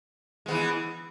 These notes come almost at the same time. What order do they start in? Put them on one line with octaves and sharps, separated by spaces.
G#3 B3 E3